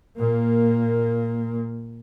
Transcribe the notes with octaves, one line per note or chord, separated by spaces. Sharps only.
A#2 A#3